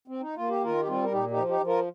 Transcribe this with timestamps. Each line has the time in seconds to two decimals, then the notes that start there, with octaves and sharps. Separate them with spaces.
0.08 C4
0.21 D#4
0.35 A#3 F4
0.49 G4
0.63 D#3 F4 A#4
0.81 G4
0.87 G3 C4 F4
1.03 A#4
1.12 A#2 D#4 G4
1.30 D#4 G4
1.36 F3
1.48 D#4 G4
1.61 F3
1.67 F4 A#4